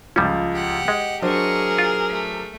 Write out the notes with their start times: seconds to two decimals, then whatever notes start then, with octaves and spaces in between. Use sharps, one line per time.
0.16 C#2 F3 G3 C#4
0.52 G4 F#5
0.88 G#3 D#5
1.22 F#3 D4 G#4 A#4 C5 D#5 C#6
1.79 F4
2.09 A3